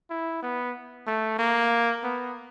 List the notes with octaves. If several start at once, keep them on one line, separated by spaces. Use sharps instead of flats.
E4
B3
A3
A#3
B3